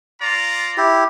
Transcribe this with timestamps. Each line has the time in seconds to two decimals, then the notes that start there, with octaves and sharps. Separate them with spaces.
0.21 F4 D5 A#5
0.77 E4 G4